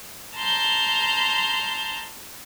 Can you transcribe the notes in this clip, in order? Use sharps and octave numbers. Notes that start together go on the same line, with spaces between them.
A5 A#5 C6 F6 G6